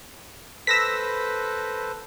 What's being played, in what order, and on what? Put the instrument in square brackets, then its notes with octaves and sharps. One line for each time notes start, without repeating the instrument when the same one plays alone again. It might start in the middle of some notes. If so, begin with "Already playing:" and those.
[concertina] A4 B4 C5 [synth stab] E6 A#6 B6